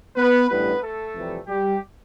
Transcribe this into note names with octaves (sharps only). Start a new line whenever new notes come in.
B3 B4
A1 G2 E3 G3 B3 B4
A3 A4
F2 C3 E3 G3
G3 G4